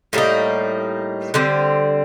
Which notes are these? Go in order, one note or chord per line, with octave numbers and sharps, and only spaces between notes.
A2 G3 A#3 D#4
D3 G3 C4